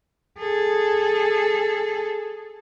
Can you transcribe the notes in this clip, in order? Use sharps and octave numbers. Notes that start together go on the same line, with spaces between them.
G#4 A4